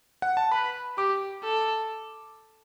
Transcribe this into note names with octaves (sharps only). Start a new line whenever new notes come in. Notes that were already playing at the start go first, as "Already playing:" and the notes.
F#5
A5
B4 B5
G4 D6
A4